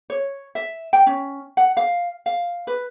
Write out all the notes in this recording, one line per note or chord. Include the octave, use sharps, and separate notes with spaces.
C#5
E5
G5
C#4
F#5
F5
F5
B4